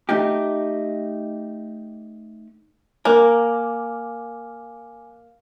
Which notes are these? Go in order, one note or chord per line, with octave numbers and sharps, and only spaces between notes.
A3 D#4 G4
A#3 A#4 G#5 D6 F#6